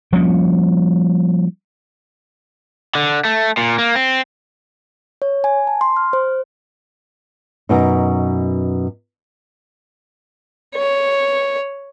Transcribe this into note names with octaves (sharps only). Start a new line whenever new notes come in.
F3 G3 A#3 C#4
D3
A3
A#2
A#3
C4
C#5
G#5
A5
C6
F6
C5
F#2 B2 D#4
C#5